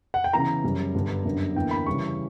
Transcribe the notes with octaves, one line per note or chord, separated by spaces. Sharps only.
F#5
G5
C#3 E3 B3 E4 A#5
F#2 C#3 G3 C#4
G2 D3 G3 B3 D4
F#2 D3 G3 B3
E2 D3 A#3 E4 G5
B5
C#3 E3 G3 C#4 C#6